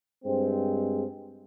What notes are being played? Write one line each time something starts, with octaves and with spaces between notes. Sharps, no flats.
G2 G#3 C4